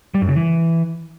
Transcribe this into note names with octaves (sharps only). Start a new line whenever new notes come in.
G3
F#2
C#3
E3